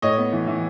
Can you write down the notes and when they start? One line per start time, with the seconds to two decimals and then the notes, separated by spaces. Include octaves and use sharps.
0.02 A2 C#5 D#5
0.17 B3
0.33 E3
0.47 E3